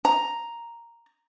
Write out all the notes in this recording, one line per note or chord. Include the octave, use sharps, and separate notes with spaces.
A#5